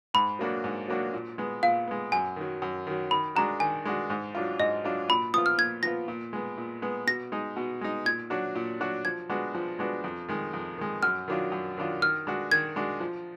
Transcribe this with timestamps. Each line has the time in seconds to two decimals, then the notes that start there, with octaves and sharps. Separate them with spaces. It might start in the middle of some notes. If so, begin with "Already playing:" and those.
0.14 G#2 B5
0.39 F#3 A#3 D4 F#4
0.64 G#2
0.88 F#3 A#3 D4 F#4
1.14 A#2
1.38 G#3 B3
1.63 A#2 F5
1.88 G#3 B3
2.12 F#2 G#5
2.36 D#3 F#3
2.62 F#2
2.87 D#3 F#3
3.11 D#3 B5
3.35 G#3 D4 F#4 A#5
3.60 D#3 G#5
3.85 G#3 D4 F#4
4.10 G#2
4.35 F#3 D4 F4
4.59 G#2 D#5
4.84 F#3 D4 F4
5.08 A#2 B5
5.34 F3 B3 F4 D#6
5.46 F6
5.58 A#2 G#6
5.83 F3 B3 F4 A#6
6.08 A#2
6.33 G#3 B3
6.58 A#2
6.82 G#3 B3
7.07 B2 A#6
7.32 G#3 D#4
7.56 B2
7.81 G#3 D#4
8.05 A#2 G#6
8.30 F#3 D4 F#4
8.55 A#2
8.80 F#3 D4 F#4
9.05 F3 G#6
9.29 G#3 B3 D4 F#4
9.55 F3
9.79 G#3 B3 D4 F#4
10.04 F2
10.29 D#3 G#3
10.53 F2
10.78 D#3 G#3
11.03 F#2 F6
11.28 D#3 F#3 D4 F4
11.52 F#2
11.77 D#3 F#3 D4 F4
12.02 D#3 F6
12.27 G#3 D4 F#4
12.52 D#3 G#6
12.76 G#3 D4 F#4
13.00 F3